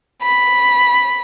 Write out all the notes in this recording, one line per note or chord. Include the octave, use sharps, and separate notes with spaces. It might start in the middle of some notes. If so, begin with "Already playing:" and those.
B5